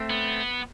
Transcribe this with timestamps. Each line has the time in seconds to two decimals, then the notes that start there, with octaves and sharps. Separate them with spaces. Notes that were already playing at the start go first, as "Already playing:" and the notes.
Already playing: A3 C4
0.10 B3